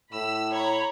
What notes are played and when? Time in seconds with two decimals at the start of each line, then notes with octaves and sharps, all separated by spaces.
0.12 A2 B5 E6
0.50 C#5 A#5 B5